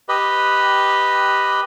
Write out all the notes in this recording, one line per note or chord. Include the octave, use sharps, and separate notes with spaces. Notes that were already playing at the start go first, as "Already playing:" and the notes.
G4 B4 D#5